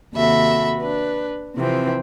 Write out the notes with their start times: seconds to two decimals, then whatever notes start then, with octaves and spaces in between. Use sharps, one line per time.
0.14 D#2 C3 F#4 A4 E5 B5
0.79 D4 B4
1.56 C3 E3 F3 C4